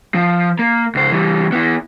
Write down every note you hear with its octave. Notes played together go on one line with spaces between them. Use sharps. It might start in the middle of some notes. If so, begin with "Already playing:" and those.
F3
A#3
C#2 C5
E3 G3
B3 E4